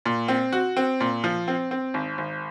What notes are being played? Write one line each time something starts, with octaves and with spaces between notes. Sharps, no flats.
A#2
C4
F#4
C4
A#2
F3
C4
C4
G#1
G#1